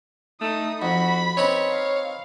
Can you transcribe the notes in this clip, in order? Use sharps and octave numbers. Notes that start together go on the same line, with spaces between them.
A3 D#4 D#6
F2 F#4 B5
C4 D#4 B4 C#5
F5